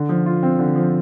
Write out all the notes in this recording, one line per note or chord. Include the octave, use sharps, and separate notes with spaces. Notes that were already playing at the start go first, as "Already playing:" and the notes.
Already playing: D3
F3
F4
C4
D3
F3